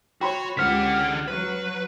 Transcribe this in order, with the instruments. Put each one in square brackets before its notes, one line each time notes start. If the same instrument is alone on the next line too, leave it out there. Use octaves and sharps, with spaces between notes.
[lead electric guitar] F#4 [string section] C#5 [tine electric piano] G5 B5 C6
[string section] C#2 G4 [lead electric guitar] D3 F#5 [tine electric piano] F6 B6
[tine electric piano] F6
[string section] F#3 [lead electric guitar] B4